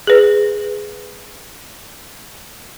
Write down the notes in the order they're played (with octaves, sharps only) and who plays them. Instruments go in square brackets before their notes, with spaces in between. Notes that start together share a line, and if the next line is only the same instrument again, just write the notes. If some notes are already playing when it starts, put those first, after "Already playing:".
[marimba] G#4 B4